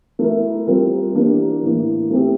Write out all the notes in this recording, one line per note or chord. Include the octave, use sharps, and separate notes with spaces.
A3 E4 A#4
G3 C4 F4 A#4
E3 A#3 D4 G4 A#4
A2 E3 A#3
A3 C4 G4